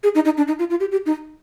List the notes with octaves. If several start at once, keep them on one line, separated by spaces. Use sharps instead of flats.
G#4
D#4
D#4
D4
D#4
F4
F4
G4
G4
D#4